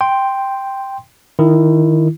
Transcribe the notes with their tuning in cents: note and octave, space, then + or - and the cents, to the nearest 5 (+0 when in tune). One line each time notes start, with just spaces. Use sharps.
G5 +0 C6 +0
D#3 +0 E4 +15